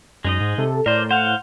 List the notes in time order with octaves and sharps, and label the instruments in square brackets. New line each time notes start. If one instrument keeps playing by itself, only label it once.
[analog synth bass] F#2 [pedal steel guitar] G#3 D#4 D#5
[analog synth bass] G#2
[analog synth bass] C3 [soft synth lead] A4
[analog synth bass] A2 [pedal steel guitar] A#4 C5 [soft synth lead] D5
[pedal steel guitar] C5 F5 [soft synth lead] F#5